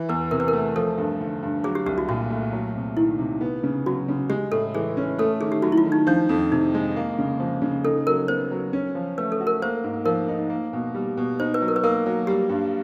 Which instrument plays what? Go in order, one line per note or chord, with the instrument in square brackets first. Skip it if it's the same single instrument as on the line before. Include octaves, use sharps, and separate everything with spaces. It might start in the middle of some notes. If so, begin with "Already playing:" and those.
Already playing: [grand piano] E3
[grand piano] E2 [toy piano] B4
[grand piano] C3 [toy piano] A#4
[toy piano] B4
A#4
[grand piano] A3
[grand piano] F3 [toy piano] A4
[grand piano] G2
D3
G2
[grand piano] F#3 [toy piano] G#4
[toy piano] G4
[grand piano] C2 [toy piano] G4
[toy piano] F#4
[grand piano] A#2 [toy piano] F#4
[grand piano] A3
F#3
C3
[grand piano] D#3 [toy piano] E4
[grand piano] C3
B3
C#3
[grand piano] F#3 [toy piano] F#4
[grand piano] C#3
[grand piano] G#3 [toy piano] G4
[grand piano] A2 [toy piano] A4
[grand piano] E3 [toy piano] G#4
[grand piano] C#4
[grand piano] A3 [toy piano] A4
[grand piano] D#3 [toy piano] G#4
[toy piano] G4
[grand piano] F#3 [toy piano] F#4
[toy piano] E4
F4
[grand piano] D#3
[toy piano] D#4
[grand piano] F3 [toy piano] D4
[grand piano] F2
[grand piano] C3 [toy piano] D#4
[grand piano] G#3
A#3
C#3
F3
C#3
[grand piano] D#4 [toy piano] A4
[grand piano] F#3 [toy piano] A#4
[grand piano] B3 [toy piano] C5
[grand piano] F#3
C#4
F3
[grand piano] A3 [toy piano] B4
[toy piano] A4
[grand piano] F#4
[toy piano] A#4
[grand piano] A#3 [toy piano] C5
[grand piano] G#2
[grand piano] F3 [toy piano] A#4
[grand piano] D#4
A#3
B2
G3
B2
[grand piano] D#4 [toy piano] C5
[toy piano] B4
[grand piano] F#3
[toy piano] A#4
B4
[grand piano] A#3 [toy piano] A#4
[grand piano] F#3
[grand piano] G3 [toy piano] G4
[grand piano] G2